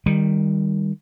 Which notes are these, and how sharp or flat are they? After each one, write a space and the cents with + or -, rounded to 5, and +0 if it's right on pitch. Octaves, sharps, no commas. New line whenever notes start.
D#3 +0 G3 +15